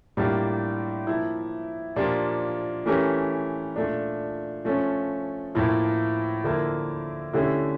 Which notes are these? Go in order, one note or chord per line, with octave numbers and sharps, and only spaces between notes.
A2 G3 A#3 D4 F4
F3 A#3 E4
A#2 F3 A#3 D4 G4
E3 A3 C#4 G4 A#4
A#2 A3 D4
F3 A3 C#4
A2 F3 A#3 E4
D3 F3 A#3 E4 A#4
D3 A3 C#4 E4 G4